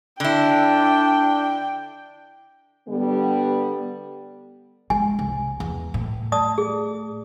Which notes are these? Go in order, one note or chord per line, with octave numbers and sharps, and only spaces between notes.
D3 D4 E4 G5
D3 G3 B3
G#3 G#5
C2
E2
A2
D5 A5 D#6
G#4